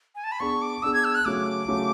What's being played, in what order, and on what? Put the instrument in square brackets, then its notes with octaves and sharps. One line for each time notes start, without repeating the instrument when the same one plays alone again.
[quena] G#5
A5
B5
[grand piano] B3 D4 G#4 [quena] C#6
[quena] D6
[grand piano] B3 D4 G#4 [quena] E6
[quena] G#6
E6
F#6
[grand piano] C#3 F#3 A3 [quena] D6
[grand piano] C#3 F#3 A3